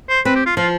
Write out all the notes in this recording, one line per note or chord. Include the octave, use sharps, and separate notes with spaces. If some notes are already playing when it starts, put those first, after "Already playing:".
C5
C4 B4
G4
F4
F3 F4